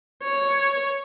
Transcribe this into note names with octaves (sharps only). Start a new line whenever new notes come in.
C#5